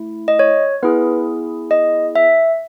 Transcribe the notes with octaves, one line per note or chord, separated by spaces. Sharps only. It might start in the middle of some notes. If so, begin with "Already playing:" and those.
Already playing: A3 E4
D#5
C#5
B3 E4 G#4 B4
D#5
E5